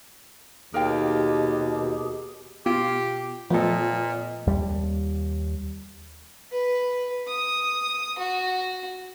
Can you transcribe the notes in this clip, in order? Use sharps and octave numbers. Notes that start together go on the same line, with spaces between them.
D#2 B2 G4 G#4 A#4 F5 G5
B2 F4 G4
A#2 F3 A3 B3 A4 D#5
D#2 G3
B4
D#6
F#4